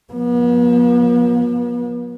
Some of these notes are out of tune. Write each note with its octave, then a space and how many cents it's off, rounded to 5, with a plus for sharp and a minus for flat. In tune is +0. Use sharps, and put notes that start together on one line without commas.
F3 +35 B3 -40